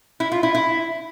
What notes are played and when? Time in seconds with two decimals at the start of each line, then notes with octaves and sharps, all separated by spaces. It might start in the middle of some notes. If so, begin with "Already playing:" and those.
0.20 E4
0.32 F4
0.43 E4
0.55 E4